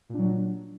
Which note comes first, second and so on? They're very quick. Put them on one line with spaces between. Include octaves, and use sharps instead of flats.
A#2 D4 F#3